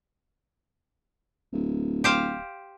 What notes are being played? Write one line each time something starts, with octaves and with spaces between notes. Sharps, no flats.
D1
G4 C5 F5